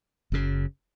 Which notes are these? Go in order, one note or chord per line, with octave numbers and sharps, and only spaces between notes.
F#1 F#2 C#3